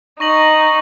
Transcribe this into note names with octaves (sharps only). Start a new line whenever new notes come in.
D#4 C#6 A#6 F#7